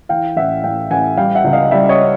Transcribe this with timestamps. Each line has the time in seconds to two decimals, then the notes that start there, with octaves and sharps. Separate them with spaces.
0.09 E3 F5 G5
0.36 A1 E5 F#5
0.64 A1 F5 G5
0.91 A1 F#5 G#5
1.17 G3 F5 G5
1.35 E5 F#5
1.44 C#2
1.53 D#5 F5
1.71 G3 D5 E5
1.89 C#5 D#5